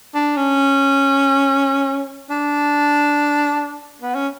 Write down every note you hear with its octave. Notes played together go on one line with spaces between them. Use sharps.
D4
C#4
D4
B3
C#4